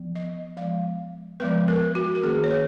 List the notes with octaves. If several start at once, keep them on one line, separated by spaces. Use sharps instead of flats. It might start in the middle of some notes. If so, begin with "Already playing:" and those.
Already playing: F3 B3
D#5
F3 G#3 B3 F5
F3 G#3 B3 B4
A#4
F#4
A#4
D#3 A#3 C#4 G#4
C#5
B4